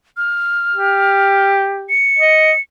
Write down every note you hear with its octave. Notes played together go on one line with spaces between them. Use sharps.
F6
G4
C#7
D#5